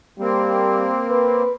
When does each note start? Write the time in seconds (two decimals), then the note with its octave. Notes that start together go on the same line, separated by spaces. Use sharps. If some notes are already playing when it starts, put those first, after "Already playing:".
0.19 G3 A#3 C4
1.09 B4